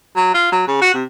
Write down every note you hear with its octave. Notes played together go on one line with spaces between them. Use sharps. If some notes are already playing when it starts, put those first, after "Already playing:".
F#3
F4
F#3
C#3
F#4
C3